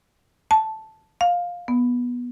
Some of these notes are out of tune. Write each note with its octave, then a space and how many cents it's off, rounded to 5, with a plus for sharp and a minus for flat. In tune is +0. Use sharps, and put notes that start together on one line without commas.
A5 -5
F5 +10
B3 -15